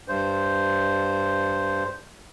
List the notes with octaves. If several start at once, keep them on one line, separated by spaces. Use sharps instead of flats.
G2 C5